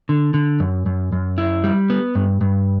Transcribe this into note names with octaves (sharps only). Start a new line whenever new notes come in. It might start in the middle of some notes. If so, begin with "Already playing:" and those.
D3
D3
F#2
F#2
F#2
E4
G3
B3
G2
G2